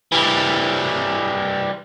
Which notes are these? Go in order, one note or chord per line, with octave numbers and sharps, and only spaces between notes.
E3 G3